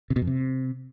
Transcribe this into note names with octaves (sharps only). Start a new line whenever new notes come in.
C3
B2
F2
C3